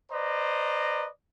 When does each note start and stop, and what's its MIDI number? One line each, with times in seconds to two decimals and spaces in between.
0.11 1.08 71
0.11 1.08 72
0.11 1.08 74
0.11 1.08 75
0.11 1.08 82